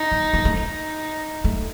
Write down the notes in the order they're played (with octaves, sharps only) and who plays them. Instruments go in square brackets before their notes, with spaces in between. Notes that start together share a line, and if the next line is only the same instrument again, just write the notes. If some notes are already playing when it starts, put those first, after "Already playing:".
Already playing: [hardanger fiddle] D#4
[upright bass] A#3
A#3
A3
[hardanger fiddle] D#4
[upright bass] A3